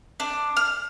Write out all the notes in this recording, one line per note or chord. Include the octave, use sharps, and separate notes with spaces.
D4
F6